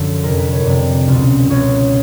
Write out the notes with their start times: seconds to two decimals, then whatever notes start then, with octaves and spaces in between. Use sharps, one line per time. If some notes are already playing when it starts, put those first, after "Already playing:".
Already playing: F#2 D3 F3
0.23 F2 C3 F3 A#4
0.38 B4
0.51 C#5
0.65 F2 C3 F3 D5
1.08 C#2 B2
1.50 C#2 B2 C#5